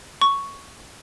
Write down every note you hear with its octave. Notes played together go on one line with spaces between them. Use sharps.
C#6